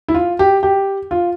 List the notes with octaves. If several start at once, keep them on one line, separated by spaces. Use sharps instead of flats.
E4
F4
G4
G4
F4